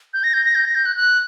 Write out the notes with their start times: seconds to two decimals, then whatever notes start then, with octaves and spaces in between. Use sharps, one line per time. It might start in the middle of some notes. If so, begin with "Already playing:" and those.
0.14 G6
0.24 A#6
0.34 G6
0.44 A#6
0.55 G6
0.65 A#6
0.75 G6
0.85 F#6
0.96 F#6